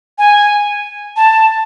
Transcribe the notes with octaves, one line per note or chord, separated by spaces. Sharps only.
G#5
A5